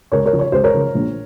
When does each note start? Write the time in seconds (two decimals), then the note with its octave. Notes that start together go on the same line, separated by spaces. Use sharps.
0.12 C#2 A#4 C#5
0.26 A#4 C#5
0.33 C#3 F3
0.39 C#5
0.52 C#2 C5
0.64 A#4 C#5
0.74 C#3 F3
0.95 A#1